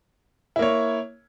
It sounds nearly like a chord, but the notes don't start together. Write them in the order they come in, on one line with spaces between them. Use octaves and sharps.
E4 A#3 C#5